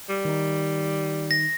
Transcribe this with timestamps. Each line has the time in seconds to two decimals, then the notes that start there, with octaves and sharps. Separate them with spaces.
0.09 G3
0.25 D#3 D#4
1.31 A#6